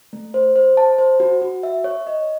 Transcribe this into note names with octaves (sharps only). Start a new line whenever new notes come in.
A3
C5
C5
A5
C5
F#4
F#4
E5
C#5
D#5